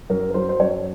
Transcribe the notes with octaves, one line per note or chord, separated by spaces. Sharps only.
F#2 A#4
A#4
F#3 C5
C5
F#2 C#5